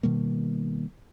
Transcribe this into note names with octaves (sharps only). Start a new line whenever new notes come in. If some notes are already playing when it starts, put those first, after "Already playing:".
B2 D#3 G3 A#3